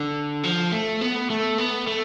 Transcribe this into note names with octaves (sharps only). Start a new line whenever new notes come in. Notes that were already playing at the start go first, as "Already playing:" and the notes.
Already playing: D3
F3
A3
B3
A3
B3
A3